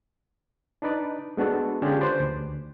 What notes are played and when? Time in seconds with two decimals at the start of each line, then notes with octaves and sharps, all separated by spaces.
0.82 D4 D#4 B4 D5
1.37 G#3 B3 D4 F#4 A4
1.82 D3 C#4 D4 F4 G4 G#4
2.01 B4 C5 D5
2.20 D2